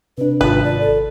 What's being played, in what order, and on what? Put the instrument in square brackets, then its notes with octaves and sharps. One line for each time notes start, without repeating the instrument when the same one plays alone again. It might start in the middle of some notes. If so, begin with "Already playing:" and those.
[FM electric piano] C3 D4 [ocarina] B4
[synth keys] G#1 A5 [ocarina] F4 [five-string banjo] B4
[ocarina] D5
A4